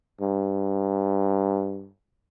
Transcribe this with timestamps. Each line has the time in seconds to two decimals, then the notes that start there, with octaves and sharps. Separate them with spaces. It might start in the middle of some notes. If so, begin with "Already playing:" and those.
0.21 G2